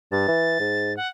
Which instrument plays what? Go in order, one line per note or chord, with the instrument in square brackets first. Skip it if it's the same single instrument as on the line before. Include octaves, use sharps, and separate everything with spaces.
[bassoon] G2 [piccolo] A6
[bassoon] E3
G#2
[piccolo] F#5